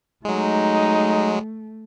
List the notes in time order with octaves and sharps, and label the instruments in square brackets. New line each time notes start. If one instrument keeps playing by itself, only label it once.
[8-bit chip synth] F#3 G#3 [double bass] A3 [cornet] D#4